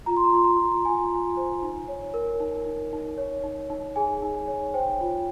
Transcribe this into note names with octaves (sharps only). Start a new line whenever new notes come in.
F4 A#5
C6
A#5
F4 C6
A#5
F4
F4 G#5
F4
C5
D#4
C#5
A#4
D#4
D#4
D#4
C#5
D#4
D#4
G#4 G#5
D#4
C#5
C5 G5
F4